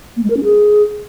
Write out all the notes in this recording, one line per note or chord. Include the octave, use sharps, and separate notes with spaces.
A#3
G#3
A#4
C#4
G#4